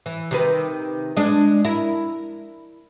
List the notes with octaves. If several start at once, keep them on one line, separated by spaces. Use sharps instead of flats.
E3
C3 D#3 B4
G#3 D4
E4 A#4